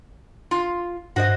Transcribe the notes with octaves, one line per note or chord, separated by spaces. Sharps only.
F4
G2 F#4 C5 D#5